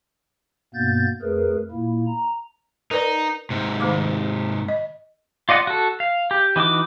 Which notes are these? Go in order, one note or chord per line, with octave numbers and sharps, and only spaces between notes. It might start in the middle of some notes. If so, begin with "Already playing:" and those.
G2 B2 A#3 B3 G6 A6
F2 A3 G#4 A#4 B4
A#2 A#3 E4
A#5
D#4 A#4 B4 D5
G#2 C3
D#3 A3 D6
D#5
F4 D5 D#5 F#5
F#4 A4
F5
G4
E3 D#4 F#4 D6